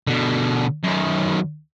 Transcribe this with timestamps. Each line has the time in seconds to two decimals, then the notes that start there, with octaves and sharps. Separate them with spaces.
0.07 B2 D3
0.83 F#2 D#3